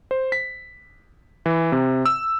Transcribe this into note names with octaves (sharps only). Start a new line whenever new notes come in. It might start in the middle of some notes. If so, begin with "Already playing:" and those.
C5
B6
E3
C3
E6